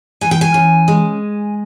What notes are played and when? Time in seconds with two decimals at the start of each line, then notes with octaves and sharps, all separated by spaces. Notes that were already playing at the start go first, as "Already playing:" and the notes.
0.21 E3 G#5
0.31 G5
0.41 G#5
0.54 C#3
0.88 G#3